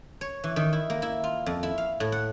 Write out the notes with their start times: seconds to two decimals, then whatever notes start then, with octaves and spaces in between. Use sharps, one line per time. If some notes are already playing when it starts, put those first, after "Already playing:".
0.21 C#5
0.44 E3
0.56 D#3
0.73 E4
0.90 A#3
1.02 E4
1.24 F4
1.46 F2
1.63 E4
1.78 F5
2.00 A2
2.12 F#5